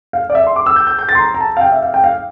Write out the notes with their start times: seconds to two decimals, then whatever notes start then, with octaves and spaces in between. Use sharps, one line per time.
0.13 F5
0.30 D5
0.35 E5
0.47 C6
0.56 D6
0.66 E6
0.76 G6
0.87 G6
0.99 G6
1.09 A6
1.15 C6
1.19 A#5
1.35 A#5
1.40 A5
1.57 F5
1.61 G5
1.72 E5
1.82 F5
1.94 G5
2.04 F5